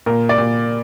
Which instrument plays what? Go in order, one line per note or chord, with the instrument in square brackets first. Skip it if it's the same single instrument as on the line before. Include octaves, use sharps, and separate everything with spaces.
[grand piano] A#2 A#4
D5
A#2